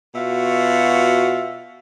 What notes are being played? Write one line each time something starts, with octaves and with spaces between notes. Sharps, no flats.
B2 F4 F#4 E5